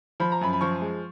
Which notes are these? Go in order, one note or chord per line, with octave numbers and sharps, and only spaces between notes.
F3 B5
A#5
F#2 B5
B5
F3 C#6
G#3